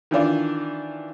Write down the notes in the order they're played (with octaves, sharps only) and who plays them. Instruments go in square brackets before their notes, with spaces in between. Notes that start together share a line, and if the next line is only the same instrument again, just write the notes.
[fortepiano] D#3 E3 D4 F4